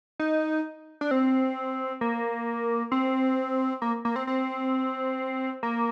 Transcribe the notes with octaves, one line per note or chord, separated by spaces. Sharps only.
D#4
D4
C4
A#3
C4
A#3
A#3
C4
C4
A#3